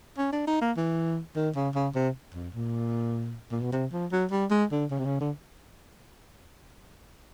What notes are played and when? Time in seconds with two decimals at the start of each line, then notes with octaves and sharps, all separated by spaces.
0.18 C#4
0.32 D4
0.47 D#4
0.61 A#3
0.77 E3
1.36 D#3
1.55 C#3
1.75 C#3
1.95 C3
2.34 F2
2.55 A#2
3.51 A#2
3.61 B2
3.72 C3
3.92 F3
4.12 F#3
4.31 G3
4.51 G#3
4.71 D3
4.90 C#3
4.99 C3
5.05 C#3
5.20 D3